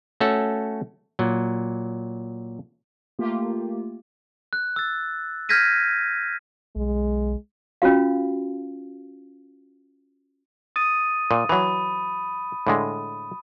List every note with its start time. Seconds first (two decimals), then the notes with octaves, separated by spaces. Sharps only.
0.20 A3 C#4 F#4 A4 C#5
1.19 A#2 F#3
3.19 A3 A#3 F4 G4
4.53 F#6
4.76 E6 A6
5.49 F6 G6 G#6 A#6 B6 D#7
6.76 B1 G#3
7.82 C#4 F4 F#4 F5
10.76 D#6 A6 D#7
11.31 A#2
11.49 E3 F#3 B5
12.67 A2 D3 G#3